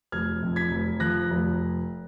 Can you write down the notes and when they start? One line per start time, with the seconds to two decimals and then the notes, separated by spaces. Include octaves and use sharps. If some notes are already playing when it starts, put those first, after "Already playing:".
0.12 F1 F6 G#6
0.43 F2
0.56 G#6 B6
0.71 F1
1.00 F3 F#6 A#6
1.30 F1